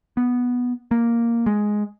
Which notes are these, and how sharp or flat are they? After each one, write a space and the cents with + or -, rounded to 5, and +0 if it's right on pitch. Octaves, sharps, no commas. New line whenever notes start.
B3 -5
A#3 +0
G#3 +5